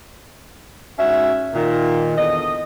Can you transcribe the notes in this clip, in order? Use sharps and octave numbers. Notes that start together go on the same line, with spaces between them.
G#2 C#4 F#4 E5
A#2 D#3
E2 D3 D#5